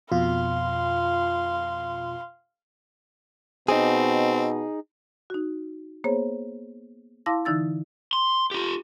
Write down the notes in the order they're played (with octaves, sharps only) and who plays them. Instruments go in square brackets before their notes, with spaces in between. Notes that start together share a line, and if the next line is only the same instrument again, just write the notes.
[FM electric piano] F2 B2 F4 [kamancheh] F5 C6
[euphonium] B2 [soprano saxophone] C4 [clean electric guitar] D#4 G#4
[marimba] D#4 F#4
A#3 B3 G#4 C5 C#5
E4 F5 A5 C6 D6 A#6
D3 E3 D#4 E6 A6
[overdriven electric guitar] C6
F4 G4